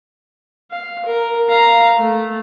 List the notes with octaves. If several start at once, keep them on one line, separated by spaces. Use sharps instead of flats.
F5
A#4
F5 A#5
A3